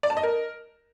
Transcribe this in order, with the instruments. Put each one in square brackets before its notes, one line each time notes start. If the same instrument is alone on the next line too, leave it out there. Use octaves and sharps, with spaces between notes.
[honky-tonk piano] D5
A5
D#5
A#4